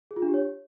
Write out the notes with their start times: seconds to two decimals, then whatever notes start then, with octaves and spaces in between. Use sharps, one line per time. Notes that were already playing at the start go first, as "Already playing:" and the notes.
0.11 G#4
0.16 F4
0.22 D4
0.28 G4
0.34 C#5